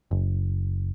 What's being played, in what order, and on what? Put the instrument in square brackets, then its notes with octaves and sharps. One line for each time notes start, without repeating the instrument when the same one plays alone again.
[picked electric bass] F#1